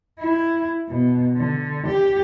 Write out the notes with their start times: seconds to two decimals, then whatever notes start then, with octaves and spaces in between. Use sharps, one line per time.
0.19 E4
0.88 B2
1.36 D3
1.87 G4